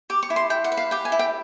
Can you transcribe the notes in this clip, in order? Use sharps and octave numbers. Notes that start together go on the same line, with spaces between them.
G4 D6
C#6
E4
C6
E4 G5
F#5
B4
F5
G4 G5
G#5
E4
G5